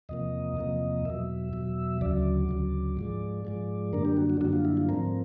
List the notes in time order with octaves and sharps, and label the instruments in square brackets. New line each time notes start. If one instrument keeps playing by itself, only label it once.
[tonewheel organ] E2 C3 F3 A#3 D#5
E2 C3 F3 A#3
E2 B2 F#3 E5
E2 B2 F#3
D2 C#3 F#3 D5
D2 C#3 F#3
G#2 F3 G#3
G#2 F3 G#3
F#2 D3 G3 A#3 D4 A#4
G4
F#4
F#4
F#2 D3 G3 A#3 D4 F#4
F4
E4
F4
G#2 F3 A3 C4 A#4